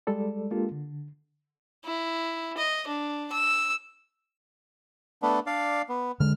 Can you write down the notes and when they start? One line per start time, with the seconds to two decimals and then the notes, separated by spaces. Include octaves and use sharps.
0.07 G3 G#3 A4 D5
0.51 G#3 A#3 D4 F4 G4 A4
0.72 D3
1.85 E4
2.57 D#5
2.87 D4
3.32 E6
5.22 A3 B3 D4
5.47 D4 D5 F5
5.89 B3
6.20 D3 G#3 F6